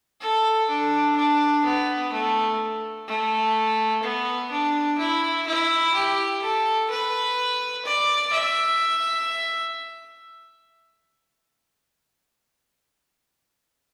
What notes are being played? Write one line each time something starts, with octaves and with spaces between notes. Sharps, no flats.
A4
D4
D4
B3
A3
A3
B3
D4
E4
E4
G4
A4
B4
D5
E5